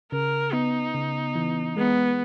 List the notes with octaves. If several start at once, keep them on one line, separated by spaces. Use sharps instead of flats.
C#3 A#4
B3 D#4
C#3
E3
G#3 B3